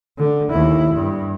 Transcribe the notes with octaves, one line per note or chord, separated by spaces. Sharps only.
D3
D#2 E4
G2